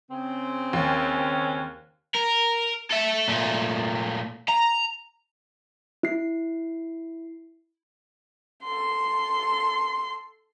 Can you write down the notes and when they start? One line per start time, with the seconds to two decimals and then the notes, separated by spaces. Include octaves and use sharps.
0.10 C#3 C4
0.73 D#2 C#4
2.15 A#4
2.91 A4 E5
3.28 A#2 A3
4.48 A#5
6.03 E4 C7
8.63 A4 C6